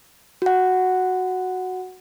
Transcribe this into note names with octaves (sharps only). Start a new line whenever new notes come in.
F#4 F#5